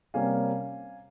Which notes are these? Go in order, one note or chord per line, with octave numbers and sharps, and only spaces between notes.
C3 G3 A#3 C#4 F5 G#5